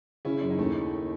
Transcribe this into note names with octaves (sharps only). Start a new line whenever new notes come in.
C#3 C#4 E4
F#2
D#4
D#2 A3 C#4